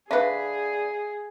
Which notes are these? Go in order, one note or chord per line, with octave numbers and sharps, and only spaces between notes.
D3 G#4 B4 E5 F5